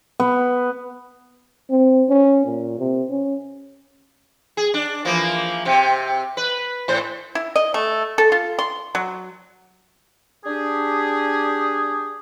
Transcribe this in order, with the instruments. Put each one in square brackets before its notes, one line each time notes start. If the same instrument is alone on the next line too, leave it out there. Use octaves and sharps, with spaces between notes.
[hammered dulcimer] B3
[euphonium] C4
C#4
A#2
C3
C#4
[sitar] G#4
D4
E3 F3 A#3
C3 C4
B4
A2 C5
[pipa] E4
D#5
A3
A4
F4
C6
F#3
[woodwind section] D4 G4 G#4